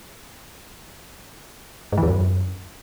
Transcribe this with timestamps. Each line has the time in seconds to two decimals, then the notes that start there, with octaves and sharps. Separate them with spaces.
1.92 G#2
1.98 E3
2.03 E2
2.08 F#2